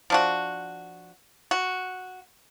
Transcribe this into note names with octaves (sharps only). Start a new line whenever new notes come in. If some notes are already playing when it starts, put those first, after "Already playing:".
F3 D4 F#4
F#4